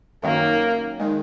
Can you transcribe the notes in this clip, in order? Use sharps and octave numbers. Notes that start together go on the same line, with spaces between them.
F#2 D#3 F#3 A#3
D#3 G#3